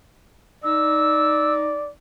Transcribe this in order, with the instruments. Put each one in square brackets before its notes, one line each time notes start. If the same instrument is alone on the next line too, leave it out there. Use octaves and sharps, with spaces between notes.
[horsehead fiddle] D#4 [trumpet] D5 [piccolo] E6